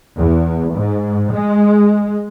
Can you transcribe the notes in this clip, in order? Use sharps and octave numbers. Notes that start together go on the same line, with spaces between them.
E2
G#2
G#3